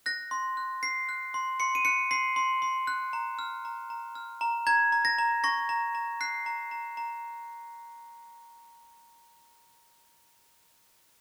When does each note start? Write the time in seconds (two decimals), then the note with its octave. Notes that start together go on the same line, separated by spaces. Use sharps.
0.06 F#6 A#6
0.31 C6
0.57 F#6
0.83 F#6 C7
1.09 F#6
1.34 C6
1.60 C6 C#7
1.75 D#7
1.85 F#6 C#7
2.11 C6 C7
2.36 C6
2.62 C6
2.87 F#6
3.13 A#5
3.39 F6
3.65 A#5
3.90 A#5
4.15 F6
4.41 A#5
4.67 A#5 G#6
4.92 A#5
5.05 A#6
5.18 A#5
5.44 C#6 A#6
5.69 A#5
5.95 A#5
6.21 F#6 C7
6.46 A#5
6.71 A#5
6.97 A#5